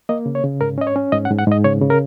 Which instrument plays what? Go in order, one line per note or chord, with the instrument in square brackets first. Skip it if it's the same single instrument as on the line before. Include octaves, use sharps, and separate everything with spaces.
[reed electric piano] A#3 D#5
C#3
C#5
C#3
G#2 A#4
C#4 D#5
C#5
C#4
G#2 D#5
F#5
G#2
F#5
G#2 D#5
C#3 C#5
C#3
A#4